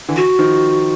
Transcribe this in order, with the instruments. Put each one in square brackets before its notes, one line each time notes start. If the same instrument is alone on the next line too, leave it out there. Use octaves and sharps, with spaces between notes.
[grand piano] D3 E3
[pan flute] F#4
[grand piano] D#3 F3